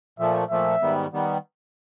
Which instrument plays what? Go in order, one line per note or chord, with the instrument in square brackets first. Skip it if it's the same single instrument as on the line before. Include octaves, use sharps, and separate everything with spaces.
[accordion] A#2 F3 A3 [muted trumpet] E5
[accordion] A#2 F3 A3 [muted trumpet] E5
[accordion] G#2 D#3 G3 B3
D#3 G3 B3